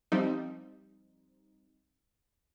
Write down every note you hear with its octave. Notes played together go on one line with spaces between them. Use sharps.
F3 G3 C4 D#4